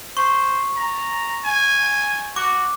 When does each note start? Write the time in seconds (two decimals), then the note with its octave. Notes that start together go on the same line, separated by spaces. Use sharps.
0.17 C5 C#6
0.76 A#5
1.44 G#5
2.36 F#4 D6